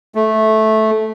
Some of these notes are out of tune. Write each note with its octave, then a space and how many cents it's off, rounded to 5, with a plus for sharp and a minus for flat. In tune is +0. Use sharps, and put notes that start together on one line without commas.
A3 -10